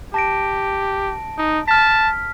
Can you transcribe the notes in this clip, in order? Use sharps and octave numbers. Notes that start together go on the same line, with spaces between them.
G4 A5 A#6 D7
D#4
A5 F6 B6